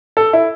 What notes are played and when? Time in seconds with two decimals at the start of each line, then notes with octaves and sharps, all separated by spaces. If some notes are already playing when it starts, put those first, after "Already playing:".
0.17 A4
0.33 E4